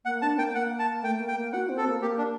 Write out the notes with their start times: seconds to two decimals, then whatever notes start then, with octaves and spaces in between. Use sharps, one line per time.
0.05 A#3 F#5
0.22 D4 A5
0.38 A#3 G5
0.55 A#3 F#5
0.79 A5
1.03 A3 G5
1.20 A#3
1.28 G5
1.37 A#3
1.53 F#4 F#5
1.69 C4
1.77 A4
1.86 A#3
2.01 A#3 G4
2.18 D4